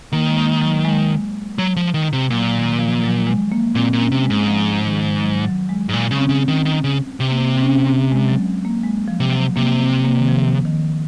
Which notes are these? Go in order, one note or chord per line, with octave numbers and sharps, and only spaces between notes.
D#3 A#3
G#3
A#3
F#3
G#3
F#3
F3
D#3
C3
A#2 F#3
D#3
F3
F#3
G#3
A#3
A#2 C4
A#2
C#4
C3
G#3
G#2
F3
D#3
F#3
F#3
G#3
G#2
A#2
C#3 C#4
C4
C#3
C4
D#3
D#3
C#3
C3
A#3
C4
C4
C#4
C4
G#3
F#3
A#3
G#3
F3
C3
F#3
C3 A#3
C4
A#3
D#3
F3
D#3